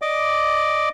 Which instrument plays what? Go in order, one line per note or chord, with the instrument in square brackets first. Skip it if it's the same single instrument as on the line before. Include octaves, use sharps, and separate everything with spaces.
[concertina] D5 D#5 D6